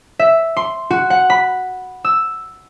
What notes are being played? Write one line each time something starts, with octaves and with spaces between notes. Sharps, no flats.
E5
C6
F#4
F#5
B5
E6